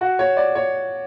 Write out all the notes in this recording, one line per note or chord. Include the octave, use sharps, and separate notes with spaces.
F#4
C#5
D5
C#5